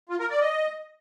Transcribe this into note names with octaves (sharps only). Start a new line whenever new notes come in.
F4
A#4
D5
D#5